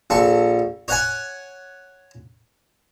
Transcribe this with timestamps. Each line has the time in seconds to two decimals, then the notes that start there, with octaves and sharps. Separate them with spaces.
0.10 A#1 A4 C#6
0.88 C#5 F#5 G#5